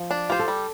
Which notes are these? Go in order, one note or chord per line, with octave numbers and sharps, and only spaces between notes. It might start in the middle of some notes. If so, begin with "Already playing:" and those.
Already playing: F3
D4
F4 G4 C5
A4
G3